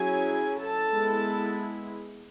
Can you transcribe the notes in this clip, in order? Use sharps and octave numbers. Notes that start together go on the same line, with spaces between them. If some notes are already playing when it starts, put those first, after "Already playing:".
Already playing: F#3 C#4 E4 G#4 G#5
A4 A5
G#3 B3 E4